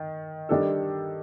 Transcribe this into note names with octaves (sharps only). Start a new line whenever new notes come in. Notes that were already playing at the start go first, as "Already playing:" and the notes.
Already playing: D#3
D#3 G3 D4 A4